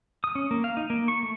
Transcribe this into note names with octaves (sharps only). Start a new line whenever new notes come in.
D#6
C#4
A#3
F5
D#4
A#3
C#6
A3